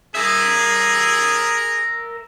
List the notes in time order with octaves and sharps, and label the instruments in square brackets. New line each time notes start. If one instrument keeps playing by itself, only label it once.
[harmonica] G#4 [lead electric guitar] A#4 E5